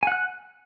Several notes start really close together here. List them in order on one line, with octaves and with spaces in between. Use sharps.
G#5 F#5 F#6